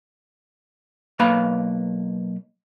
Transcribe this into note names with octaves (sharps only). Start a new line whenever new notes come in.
B1 A#3 B4 F5 B5